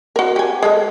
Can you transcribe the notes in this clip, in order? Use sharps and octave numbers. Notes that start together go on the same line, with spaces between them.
F#4 A#4
G4 G#5
G#3 A4 A#4